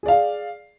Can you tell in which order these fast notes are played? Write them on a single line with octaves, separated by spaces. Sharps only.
G#4 D5 F5